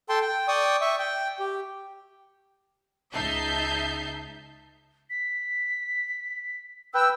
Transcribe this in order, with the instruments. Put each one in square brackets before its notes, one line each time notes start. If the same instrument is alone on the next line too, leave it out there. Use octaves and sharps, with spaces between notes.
[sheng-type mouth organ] A4 G5 A5 C6
G5
D5 G5 C#6 D#6
E5 C#6
G5
G4
[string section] C#2 D#4 E5 A5 G6 C7
[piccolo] B6
[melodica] B4 G5 [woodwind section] E6